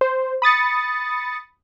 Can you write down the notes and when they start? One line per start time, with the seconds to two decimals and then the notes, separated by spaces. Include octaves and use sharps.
0.01 C5
0.42 B5 D#6 A6 C#7